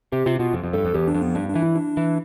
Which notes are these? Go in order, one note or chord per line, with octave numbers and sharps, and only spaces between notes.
C3 G4
C3 F4
B2 F4
F2
F2
G2 A4
F2
E2 G4
D4
F2
B3
G2 D4
D4
E3
E4
D4
E3